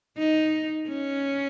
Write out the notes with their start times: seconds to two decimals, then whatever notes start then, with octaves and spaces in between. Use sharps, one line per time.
0.18 D#4
0.88 C#4